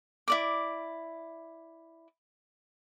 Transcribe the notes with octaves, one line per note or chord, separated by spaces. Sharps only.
E4 D5 D6